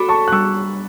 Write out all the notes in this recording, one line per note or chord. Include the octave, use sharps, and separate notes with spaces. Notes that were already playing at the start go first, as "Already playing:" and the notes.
Already playing: F#4 A4 B5 D6
A5 C#6
F#6
G3 C#6 E6